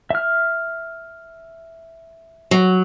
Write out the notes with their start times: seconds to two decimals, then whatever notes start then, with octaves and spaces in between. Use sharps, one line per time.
0.11 E5 F6
2.51 F#3